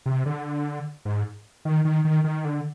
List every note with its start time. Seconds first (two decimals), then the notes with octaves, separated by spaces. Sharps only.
0.06 C3
0.26 D3
1.05 G#2
1.65 D#3
1.85 D#3
2.05 D#3
2.24 D#3
2.45 D3